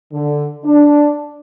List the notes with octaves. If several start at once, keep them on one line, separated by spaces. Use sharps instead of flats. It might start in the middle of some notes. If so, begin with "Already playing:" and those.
D3
D4